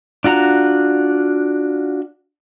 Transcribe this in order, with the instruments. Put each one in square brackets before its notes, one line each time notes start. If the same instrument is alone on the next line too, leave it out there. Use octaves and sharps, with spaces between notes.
[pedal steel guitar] D4 F4 F#4 A#5